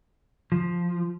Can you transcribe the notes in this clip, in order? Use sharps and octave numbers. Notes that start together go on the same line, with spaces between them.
F3